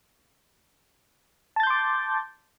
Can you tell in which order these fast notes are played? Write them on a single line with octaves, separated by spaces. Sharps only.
A5 A6 G6 C6 D6